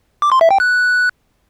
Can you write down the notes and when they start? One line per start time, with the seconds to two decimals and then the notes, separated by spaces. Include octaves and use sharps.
0.22 D6
0.32 C6
0.41 E5
0.51 G5
0.60 F#6